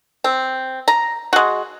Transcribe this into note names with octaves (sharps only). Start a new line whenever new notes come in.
C4
A#5
G#3 F#4